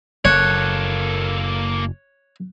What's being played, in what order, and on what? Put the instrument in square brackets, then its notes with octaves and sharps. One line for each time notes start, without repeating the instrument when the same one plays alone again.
[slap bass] F#1 [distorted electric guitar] A#3 A4 [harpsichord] C#5 [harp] F#6